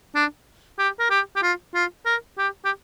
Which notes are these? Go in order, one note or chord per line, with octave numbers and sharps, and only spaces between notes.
D4
G4
A#4
G4
G4
F4
F4
A#4
G4
G4